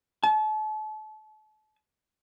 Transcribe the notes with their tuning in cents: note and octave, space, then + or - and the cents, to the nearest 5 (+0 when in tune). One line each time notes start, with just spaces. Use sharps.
A5 -35